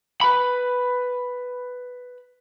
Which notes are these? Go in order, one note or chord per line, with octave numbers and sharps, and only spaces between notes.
B4 B5